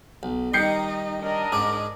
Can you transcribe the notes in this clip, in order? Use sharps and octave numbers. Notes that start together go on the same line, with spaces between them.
B1
D#3 G3 D#4 D#5 G6 C7 C#7
D4 A#4 D#5
G#2 G#4 D6